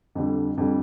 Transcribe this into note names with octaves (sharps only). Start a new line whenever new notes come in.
F2 D3 G3
F2 D3 G3